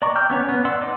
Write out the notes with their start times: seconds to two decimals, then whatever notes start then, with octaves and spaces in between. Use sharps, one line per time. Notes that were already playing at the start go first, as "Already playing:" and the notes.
0.02 D5 D#5 A#5 C#6 D6
0.15 G5 D6 E6 F6 G6
0.30 B3 C#4 C#5
0.49 B3
0.65 D5 F#5 C6 E6
0.81 D#4 D6